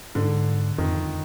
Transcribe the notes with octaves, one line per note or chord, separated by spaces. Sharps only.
G#2 D3
F2 D#3